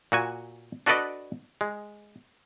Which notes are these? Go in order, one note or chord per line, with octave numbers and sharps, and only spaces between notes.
A#2 F#4 G#5
D4 F#4 A4 B4 D5 D#5
G#3